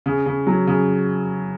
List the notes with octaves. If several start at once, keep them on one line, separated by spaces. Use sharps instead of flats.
C#3
C#3
F#3
C#3